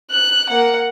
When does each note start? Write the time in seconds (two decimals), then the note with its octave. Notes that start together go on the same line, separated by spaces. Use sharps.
0.11 F#6
0.49 A#3 F#5